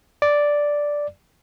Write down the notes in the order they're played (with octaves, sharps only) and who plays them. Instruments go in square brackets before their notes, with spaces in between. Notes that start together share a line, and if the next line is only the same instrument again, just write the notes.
[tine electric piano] D5